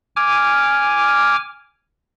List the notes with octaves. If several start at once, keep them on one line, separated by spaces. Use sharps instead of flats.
G#5 D6 F6